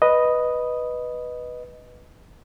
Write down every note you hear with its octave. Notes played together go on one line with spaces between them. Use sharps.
B4 D#5